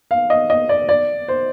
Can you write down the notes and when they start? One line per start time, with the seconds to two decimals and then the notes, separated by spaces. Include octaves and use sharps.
0.11 F5
0.30 D#5
0.50 D#5
0.69 D5
0.89 D5
1.28 C5